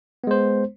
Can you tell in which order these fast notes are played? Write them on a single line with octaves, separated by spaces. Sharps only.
B3 G#3 C5